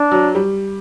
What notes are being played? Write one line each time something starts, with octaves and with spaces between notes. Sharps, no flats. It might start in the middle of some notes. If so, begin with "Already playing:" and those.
Already playing: D4
F#3
G3